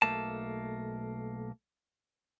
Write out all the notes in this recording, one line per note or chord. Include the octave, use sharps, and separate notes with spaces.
B1 A3 A#3 A5